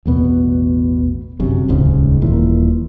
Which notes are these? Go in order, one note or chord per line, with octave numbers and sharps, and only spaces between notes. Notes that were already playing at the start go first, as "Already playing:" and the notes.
A1 E2 B2 B3
G1 F#2 C3
D#1 C#2 G#2 C#3
D#1 A#2 E3